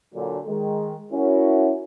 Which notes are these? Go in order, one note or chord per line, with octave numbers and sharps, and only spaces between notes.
A#2 D3 F#3
D#3 G#3
C#4 E4 F#4 A#4